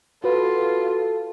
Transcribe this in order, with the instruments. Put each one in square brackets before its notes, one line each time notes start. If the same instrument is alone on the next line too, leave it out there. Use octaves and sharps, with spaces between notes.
[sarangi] F4 [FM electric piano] F#4 B4 [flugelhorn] A4